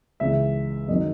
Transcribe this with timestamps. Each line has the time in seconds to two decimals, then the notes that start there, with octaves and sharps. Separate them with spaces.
0.20 C#2 C#3 E3 E5
0.88 F#2 D#3 F#3 D#5